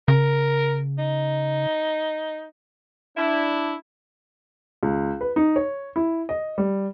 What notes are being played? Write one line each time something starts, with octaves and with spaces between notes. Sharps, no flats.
C#3 A#4
D#4
D4 E4
C#2
B4
D#4
C#5
E4
D#5
G3